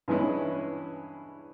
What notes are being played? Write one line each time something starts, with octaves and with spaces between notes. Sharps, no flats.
G2 E3 G#3 C#4 E4